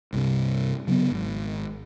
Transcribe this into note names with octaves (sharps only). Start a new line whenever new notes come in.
C2 G2 C3
C#3 F#3 G3 B3
G#1